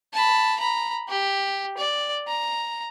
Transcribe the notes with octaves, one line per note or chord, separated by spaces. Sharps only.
A5 B5
A#5 B5
G4
D5
A#5